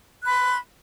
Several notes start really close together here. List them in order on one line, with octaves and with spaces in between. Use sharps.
F#6 B5 C6